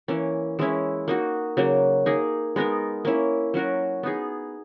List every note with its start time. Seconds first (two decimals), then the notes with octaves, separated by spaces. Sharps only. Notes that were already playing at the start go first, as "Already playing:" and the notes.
0.08 E3 A#3 C#4
0.59 E3 G#3 C#4 E4
1.08 A#3 D#4 F#4
1.57 C#3 F#3 A#3
2.06 A#3 D#4 G#4
2.56 G#3 B3 D#4 A#4
3.05 A#3 C#4 E4
3.54 F#3 C#4 F#4 A#4
4.03 B3 D#4 G#4